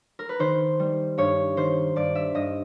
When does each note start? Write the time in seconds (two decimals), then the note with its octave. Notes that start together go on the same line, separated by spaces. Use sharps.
0.19 A#4
0.29 B4
0.39 D#3 C5
0.79 G3
1.18 G2 C#5
1.57 D#3 C5
1.96 G2 D5
2.15 E5
2.34 G2 D#5